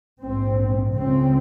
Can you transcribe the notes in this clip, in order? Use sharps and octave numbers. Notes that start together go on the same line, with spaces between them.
A#1 G#2 C4
C#2 C#3 C4